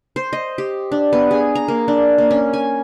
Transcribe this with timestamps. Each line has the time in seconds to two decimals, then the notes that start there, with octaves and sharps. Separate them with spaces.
0.16 C5
0.33 D#5
0.58 G4
0.92 D4
1.13 B3
1.31 G#4
1.55 A#5
1.68 A#3
1.88 D4
2.18 A#3
2.31 C#4
2.53 G#5